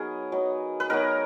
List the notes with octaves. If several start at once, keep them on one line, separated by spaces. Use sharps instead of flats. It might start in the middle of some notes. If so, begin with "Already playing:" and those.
Already playing: F#3 B3 D#4 G#4 A#4
F#3 B3 D#4
B4
F#3 B3 D#4 A#4